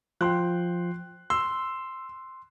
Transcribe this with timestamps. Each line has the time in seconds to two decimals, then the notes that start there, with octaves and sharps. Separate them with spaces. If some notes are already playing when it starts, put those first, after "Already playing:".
0.21 F3 F4 G5 C6 F#6
1.30 C6 E6